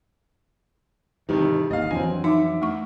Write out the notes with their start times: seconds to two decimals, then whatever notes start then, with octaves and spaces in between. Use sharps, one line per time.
1.29 F2 G#2 C3 D#3 E3 G4
1.71 G#1 D#2 D#5 F5
1.91 F2 E3 F#3 C4 D4 G#5
2.24 D#4 E5 D6
2.62 A3 D4 C#6